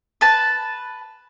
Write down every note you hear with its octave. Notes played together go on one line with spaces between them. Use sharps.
B4 A5